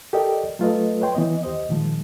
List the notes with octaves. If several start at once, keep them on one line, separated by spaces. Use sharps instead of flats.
G4 A4 A#4 D5 D#5 G5
F#3 A3 F4 A4 B4 D#5
B4 C#5 G5 C6
E3 B3 D#5
D#2 G4 C5 D#5
A#2 D#3 F3 G#3